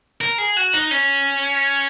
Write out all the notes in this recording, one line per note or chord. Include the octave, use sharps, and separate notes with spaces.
A#4
G#4
F#4
D#4
C#4